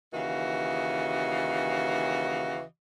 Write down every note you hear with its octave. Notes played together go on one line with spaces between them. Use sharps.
D#2 C#3 E3 F#4 D#5 F5